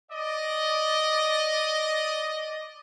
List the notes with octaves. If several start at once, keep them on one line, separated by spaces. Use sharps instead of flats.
D5 D#5